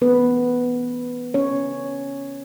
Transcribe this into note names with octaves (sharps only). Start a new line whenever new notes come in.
E3 A3 B3 C#4 B4
C#4 C#5